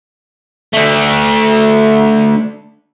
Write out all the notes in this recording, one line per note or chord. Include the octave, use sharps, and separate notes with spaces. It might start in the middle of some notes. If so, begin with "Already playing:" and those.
A3 D4